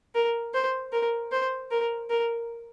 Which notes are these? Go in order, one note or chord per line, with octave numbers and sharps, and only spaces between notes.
A#4
C5
A#4
C5
A#4
A#4